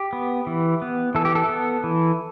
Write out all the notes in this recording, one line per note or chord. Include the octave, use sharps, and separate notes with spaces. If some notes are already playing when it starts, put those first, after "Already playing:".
Already playing: G4
B3
E3
B3
E3 A4
G4
A4
B3
E3